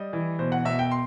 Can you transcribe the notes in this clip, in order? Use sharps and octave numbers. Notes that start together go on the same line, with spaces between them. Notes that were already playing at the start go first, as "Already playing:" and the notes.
Already playing: G3 D#5
E3
B2 C5
F#5
B2 E5
G5
C6